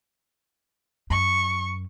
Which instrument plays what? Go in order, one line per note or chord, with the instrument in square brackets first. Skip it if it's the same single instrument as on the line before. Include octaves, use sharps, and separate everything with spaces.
[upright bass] F#2 [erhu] C#6